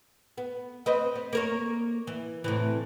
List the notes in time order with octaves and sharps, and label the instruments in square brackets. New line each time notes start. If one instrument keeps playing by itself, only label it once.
[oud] B3
C4 B4 D#5
B3
A#3 A#4 C#5
E3
A2 C3 E3